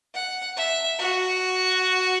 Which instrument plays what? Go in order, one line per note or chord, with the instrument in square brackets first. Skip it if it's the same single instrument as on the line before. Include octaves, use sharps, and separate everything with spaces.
[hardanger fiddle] F#5
E5
F#4